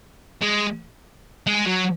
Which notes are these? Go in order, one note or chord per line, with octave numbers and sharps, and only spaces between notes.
G#3
G#3
F#3